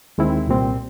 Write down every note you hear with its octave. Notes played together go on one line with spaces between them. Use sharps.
D#2 D#3 G#3 C4 E4
C2 A#2 G3 C4